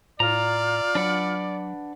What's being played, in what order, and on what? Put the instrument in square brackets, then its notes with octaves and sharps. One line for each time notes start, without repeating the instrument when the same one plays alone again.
[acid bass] A2 [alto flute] F4 [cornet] D5 [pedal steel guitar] A#5
[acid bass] F#3 [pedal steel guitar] D4 B4 F#5